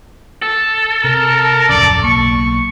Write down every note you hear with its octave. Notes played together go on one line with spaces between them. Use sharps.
A4
C3 A#4
D1 F2 C#3 D5
B1 A#3 C#6